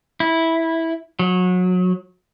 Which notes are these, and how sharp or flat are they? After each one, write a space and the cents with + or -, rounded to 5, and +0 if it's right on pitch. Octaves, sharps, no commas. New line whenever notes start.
E4 -10
F#3 -25